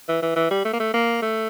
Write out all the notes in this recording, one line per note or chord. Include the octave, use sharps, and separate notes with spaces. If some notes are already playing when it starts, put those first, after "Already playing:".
E3
E3
E3
G3
A3
A#3
A3
A#3
A3